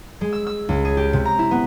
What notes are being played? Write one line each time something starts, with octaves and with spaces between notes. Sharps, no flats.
G#3
E6
E6
C#2
G#4
G4
C3
A#5
E4
B3